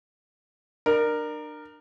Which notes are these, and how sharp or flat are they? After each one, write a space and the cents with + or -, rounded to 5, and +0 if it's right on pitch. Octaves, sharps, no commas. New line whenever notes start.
D4 +35 A#4 +0